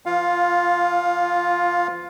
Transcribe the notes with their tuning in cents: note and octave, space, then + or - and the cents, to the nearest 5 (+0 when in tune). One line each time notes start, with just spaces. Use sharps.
F3 -35 F4 +0 F5 +20